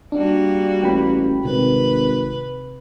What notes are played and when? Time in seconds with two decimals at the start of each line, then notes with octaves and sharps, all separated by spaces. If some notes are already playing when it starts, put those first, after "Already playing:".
0.12 G3 A#3 D4 F#4
0.83 A1 G5 B5
1.45 G#1 C3 B4